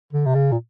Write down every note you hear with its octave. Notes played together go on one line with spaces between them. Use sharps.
D3
C3
C#3
A#2